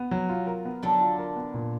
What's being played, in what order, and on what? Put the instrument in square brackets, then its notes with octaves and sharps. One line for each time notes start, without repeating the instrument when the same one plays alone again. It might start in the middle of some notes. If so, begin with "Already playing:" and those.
Already playing: [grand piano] B3
F#3
F4
A#4
B3
[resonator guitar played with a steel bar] D3 D4 [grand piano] F#3
[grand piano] F4
A#4
B3
A#2